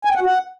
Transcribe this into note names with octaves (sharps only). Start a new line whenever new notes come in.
G#5
G5
F#5
F#4
F#5